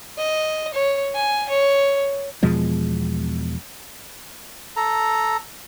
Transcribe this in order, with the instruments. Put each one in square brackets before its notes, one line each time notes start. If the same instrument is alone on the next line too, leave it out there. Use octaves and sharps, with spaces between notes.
[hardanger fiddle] D#5
C#5
G#5
C#5
[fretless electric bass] E2 B2 F3 G#3
[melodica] A4 A#5